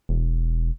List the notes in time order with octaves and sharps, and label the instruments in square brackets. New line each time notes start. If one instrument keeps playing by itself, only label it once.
[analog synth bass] E1